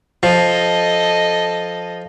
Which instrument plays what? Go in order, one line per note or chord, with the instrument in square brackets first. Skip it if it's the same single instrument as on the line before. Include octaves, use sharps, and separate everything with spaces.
[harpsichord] F3 [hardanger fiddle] A4 D#5